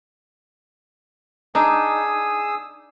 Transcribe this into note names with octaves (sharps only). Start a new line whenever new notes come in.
D4 D#4 G#4 D#6 E6